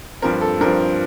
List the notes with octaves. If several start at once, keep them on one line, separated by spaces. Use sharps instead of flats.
G2 F3 C4 A#4
A4
G2 F3 C4 A#4